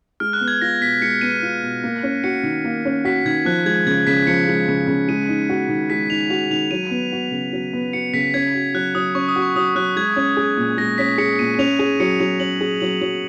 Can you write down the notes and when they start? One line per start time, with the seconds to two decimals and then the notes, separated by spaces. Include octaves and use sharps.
0.20 G#3 F6
0.33 F#6
0.41 B3
0.48 G#6
0.61 F4 A#6
0.81 B2 B6
1.01 G#3 C#7
1.21 B3 D#7
1.43 F4
1.63 B2
1.84 A#3
2.03 C#4
2.24 F#4 C#7
2.43 D#3
2.64 A#3
2.85 C#4
3.05 F#4 B6
3.25 D#3 G#6
3.45 F3 F#6
3.66 G#3 G#6
3.86 C#3 G#6
4.07 C#3 B6
4.27 F3 C#7
4.48 G#3
4.68 C#3
4.88 C#3
5.09 G#3 D#7
5.29 D#4
5.49 F#4
5.69 D#3
5.90 G#3 B6
6.10 D#4 F7
6.30 F#4 F7
6.50 D#3 F7
6.71 F#3 D#7
6.91 B3
7.12 F#4
7.31 C#3
7.53 F#3
7.73 B3
7.93 F#4 C#7
8.13 C#3 B6
8.34 C#4 G#6
8.54 F#4
8.74 F#3 F#6
8.95 F#3 D#6
9.15 C#4 C#6
9.29 D#6
9.36 F#4
9.42 C#6
9.56 F#3 D#6
9.75 F#3 F#6
9.96 G#3 G#6
10.16 C#4
10.37 G#4
10.57 A#2
10.78 G#3 A#6
10.98 C#4 B6
11.18 G#4 C#7
11.39 A#2 D#7
11.54 D#7
11.59 C#4 F7
11.79 G#4 D#7
12.00 F#3 C#7
12.20 F#3 F7
12.40 C#4 F#7
12.61 G#4
12.80 F#3 F#7
13.01 F#3